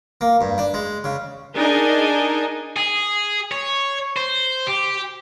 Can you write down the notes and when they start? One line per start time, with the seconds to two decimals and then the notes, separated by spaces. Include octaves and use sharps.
0.21 A#3
0.41 G2
0.58 D4
0.74 G#3
1.04 C#3
1.55 D4 D#4 G#4 A#4 D#5 G#5
2.77 G#4
3.51 C#5
4.17 C5
4.67 G4